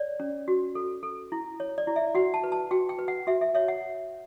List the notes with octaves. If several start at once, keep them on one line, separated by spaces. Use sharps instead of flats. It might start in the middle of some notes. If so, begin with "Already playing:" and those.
Already playing: C#5 D5
C#4
F#4
A4
A4
E4
C#5
D5
E4
E5
F#4 F#5
A5
B4
A5
F#4 G5
G5
B4
F#5
F#4 E5
E5
C#5 E5
F#5